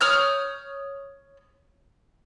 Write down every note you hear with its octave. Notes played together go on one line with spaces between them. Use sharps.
C#5 D#6 F6 G6